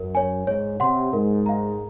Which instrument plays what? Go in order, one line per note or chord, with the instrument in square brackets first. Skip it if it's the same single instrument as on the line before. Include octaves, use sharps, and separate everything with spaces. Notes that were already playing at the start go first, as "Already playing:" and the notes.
Already playing: [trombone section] F#2 [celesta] A#4
[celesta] C#5 G#5
[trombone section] G#2 [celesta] C#5
[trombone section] C3 [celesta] F#5 C6
[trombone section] G#2 [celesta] A#4
[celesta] F5 A#5